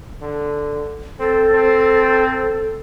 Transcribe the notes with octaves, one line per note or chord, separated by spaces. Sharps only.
D3
C4 A4
C4